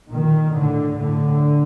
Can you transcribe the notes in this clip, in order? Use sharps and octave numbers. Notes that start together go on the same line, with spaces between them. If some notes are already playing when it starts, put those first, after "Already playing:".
A#2 D#3
A2 D3
A2 D3